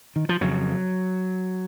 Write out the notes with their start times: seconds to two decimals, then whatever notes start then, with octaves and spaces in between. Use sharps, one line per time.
0.16 D#3
0.29 F3
0.41 F2 C#3 F#3